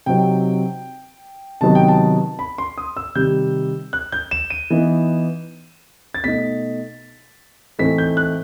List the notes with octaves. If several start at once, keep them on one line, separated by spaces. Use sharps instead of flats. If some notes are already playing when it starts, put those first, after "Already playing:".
C3 F#3 C4 D#4 G5
C3 D#3 F#3 B3 D#4 A5
G5
A5
B5
C6
D#6
E6
C3 D#3 G3 G6
F#6
G6
E7
D#7
E3 B3 D#4
A6
B2 A3 D#4 B6
A2 E3 A3 C4 D#4 B6
G6
F#6